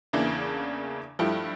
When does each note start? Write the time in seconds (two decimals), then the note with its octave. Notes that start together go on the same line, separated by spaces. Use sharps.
0.13 E2 C#3 E3 A#3 D4
1.19 G2 F3 A3 E4 G4